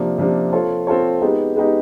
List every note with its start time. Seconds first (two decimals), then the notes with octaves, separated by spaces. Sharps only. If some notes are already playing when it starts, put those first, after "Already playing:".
Already playing: C3 F3 A#3 D4
0.18 C3 F3 A#3 D4
0.53 C4 F4 A4 C#5
0.87 C4 F4 A4 C#5
1.21 G#3 B3 D#4 G4
1.56 G#3 B3 D#4 G4